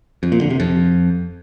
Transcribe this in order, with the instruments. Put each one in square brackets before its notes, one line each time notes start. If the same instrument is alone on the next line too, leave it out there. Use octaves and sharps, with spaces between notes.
[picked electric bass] F2
A#2
D3
C3
F2